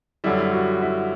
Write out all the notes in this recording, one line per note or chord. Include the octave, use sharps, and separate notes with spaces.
F#2 D3 G3 E4
F#4
E4